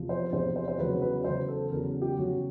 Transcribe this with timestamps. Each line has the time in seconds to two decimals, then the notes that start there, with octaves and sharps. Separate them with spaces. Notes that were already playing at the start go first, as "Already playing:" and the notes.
Already playing: E2 C3 F3
0.09 C5
0.32 E2 C3 F3 C5
0.56 C5
0.68 C5
0.78 E2 C#3 F#3 B4
1.02 B4
1.21 B4
1.24 E2 C#3 F#3 C5
1.48 A4
1.71 E2 C#3 F#3 A#4
2.02 G4
2.17 E2 C#3 F#3 F#4